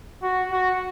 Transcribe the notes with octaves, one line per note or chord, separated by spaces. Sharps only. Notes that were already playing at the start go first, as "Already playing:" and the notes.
F#4
F#4